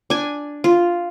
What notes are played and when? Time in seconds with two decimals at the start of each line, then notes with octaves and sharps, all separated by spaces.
0.10 D4 G#5
0.64 F4